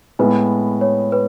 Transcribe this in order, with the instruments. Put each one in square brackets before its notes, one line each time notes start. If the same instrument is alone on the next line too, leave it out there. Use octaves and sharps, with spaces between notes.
[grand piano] A2 G#3 B3 [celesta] B4
[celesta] C#5
B4